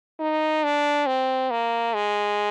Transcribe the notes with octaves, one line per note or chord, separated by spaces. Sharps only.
D#4
D4
C4
A#3
G#3